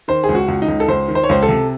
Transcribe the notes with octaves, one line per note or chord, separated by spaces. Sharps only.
D#3 C5
G#4
C#2
F#4
C#2
D#4
C#2
A4
C#2 C5
D#3
C5
C#5
C#2 C5
A4
C3